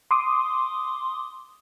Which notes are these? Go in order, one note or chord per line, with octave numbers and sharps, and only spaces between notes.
C6 D6 D#6